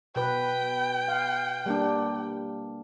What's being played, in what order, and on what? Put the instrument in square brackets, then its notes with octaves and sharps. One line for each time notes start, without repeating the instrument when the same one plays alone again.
[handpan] B2 B4 [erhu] G5
[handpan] F5
G3 A#3 D4